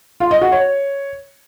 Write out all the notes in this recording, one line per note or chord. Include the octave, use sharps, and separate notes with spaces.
F4
D#5
F#4
C#5